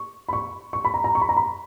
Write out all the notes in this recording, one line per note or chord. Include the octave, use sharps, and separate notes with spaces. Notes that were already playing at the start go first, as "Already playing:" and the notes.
Already playing: C#6
B5
C#6
C#6
B5
A#5
A#5
C#6
B5
A#5
B5